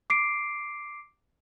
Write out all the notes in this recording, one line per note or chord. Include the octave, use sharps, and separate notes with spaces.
D6 C7 D7